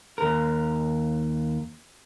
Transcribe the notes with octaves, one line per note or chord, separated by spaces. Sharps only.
D#2 A#4